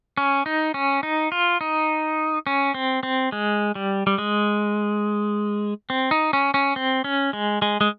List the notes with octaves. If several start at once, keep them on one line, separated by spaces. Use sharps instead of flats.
C#4
D#4
C#4
D#4
F4
D#4
C#4
C4
C4
G#3
G3
G3
G#3
C4
D#4
C#4
C#4
C4
C#4
G#3
G#3
G#3